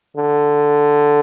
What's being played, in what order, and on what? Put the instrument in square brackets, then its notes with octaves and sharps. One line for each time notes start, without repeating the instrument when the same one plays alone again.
[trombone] D3